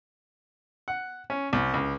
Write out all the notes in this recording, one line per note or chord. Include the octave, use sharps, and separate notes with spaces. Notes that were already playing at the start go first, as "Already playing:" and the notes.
F#5
C#4
C2
C#2